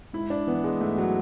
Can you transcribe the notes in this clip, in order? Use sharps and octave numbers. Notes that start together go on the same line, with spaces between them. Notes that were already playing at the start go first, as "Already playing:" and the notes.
G#2 E4
D4
E3 B3
G#3
G#2 A3
F#3